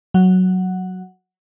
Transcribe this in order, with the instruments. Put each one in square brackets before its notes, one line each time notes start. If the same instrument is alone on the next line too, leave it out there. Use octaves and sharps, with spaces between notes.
[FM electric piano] F#3 F#5